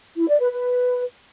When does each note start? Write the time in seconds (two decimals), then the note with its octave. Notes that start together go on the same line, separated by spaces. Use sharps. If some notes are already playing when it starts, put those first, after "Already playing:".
0.17 E4
0.28 D5
0.40 B4
0.51 B4